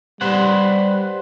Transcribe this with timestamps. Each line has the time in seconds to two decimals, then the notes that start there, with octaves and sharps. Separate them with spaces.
0.21 G3 B4 C5 F#5